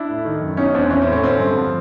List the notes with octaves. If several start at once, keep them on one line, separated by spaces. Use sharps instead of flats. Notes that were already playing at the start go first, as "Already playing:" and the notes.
Already playing: D4 E4
A2
D#3
F#2
B2 C#4 D#4
E2 C4 D4
E3 C#4
C4
A2
C#4
D3 C4
G2
F3